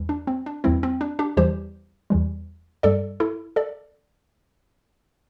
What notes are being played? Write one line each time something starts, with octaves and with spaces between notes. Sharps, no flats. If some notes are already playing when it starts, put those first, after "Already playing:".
Already playing: E2 E3 G3
D4
C4
D4
E2 E3 G3 C4 E4
C4
D4
D4 G4
E2 E3 G3 G4 C5
E2 E3 G3
G2 G3 A4 D5
E4 A4
A4 D5